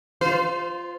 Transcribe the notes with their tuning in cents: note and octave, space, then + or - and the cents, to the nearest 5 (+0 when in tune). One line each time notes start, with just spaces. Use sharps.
F4 +0 C5 -35